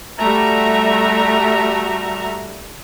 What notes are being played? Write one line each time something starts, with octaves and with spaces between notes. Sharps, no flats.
G3 A3 F#4 E5 A#5